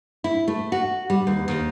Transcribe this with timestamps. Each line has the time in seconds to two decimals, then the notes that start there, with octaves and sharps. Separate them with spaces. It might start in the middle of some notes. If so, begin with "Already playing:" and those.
0.24 E4
0.48 A3
0.72 F#4
1.10 G3
1.27 D#2
1.48 D#2